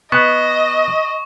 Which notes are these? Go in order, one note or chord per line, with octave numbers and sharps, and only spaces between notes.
B3 D#5 C#6